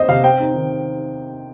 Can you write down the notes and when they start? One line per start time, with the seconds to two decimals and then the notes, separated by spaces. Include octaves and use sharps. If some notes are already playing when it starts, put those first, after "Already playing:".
Already playing: C4 C5 D#5
0.08 C3 F5
0.24 C4 G5
0.40 D#4
0.54 D#3